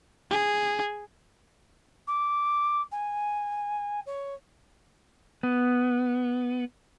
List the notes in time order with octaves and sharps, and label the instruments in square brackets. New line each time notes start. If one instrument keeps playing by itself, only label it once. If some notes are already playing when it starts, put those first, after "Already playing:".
[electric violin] G#4
[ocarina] D6
G#5
C#5
[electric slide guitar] B3